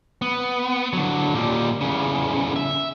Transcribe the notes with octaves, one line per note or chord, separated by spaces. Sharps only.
B3
D3 F#3
A#2 G3
E2 C#3
E5